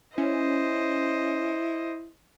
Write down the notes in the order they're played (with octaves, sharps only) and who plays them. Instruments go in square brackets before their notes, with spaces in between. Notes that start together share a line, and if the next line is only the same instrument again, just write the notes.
[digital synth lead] C#4 [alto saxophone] E4 [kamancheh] C5 D#5